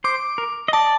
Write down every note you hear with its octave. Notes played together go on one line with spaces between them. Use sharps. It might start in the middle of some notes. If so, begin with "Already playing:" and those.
C5 D6
A#4
D#5
D5 A5